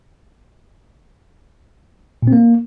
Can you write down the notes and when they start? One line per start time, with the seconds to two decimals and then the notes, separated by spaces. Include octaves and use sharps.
2.22 A#2
2.28 C4
2.33 A#3